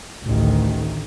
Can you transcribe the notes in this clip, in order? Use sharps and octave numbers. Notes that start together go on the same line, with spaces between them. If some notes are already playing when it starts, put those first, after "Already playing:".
A1 D2 D#3